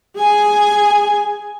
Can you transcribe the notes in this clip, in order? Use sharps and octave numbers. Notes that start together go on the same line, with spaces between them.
G#4 G#5